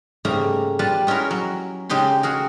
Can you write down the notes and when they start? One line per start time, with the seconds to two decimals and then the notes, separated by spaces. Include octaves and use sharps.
0.25 G#2 C#3 G3 A3 A#3 A#5
0.79 G3 F4 B4 A5
1.07 G#3 C#4 E4 F#4 A#4
1.31 F#3
1.89 C#3 G#3 D#4 G4 C6
2.23 F#4 G#4 A#4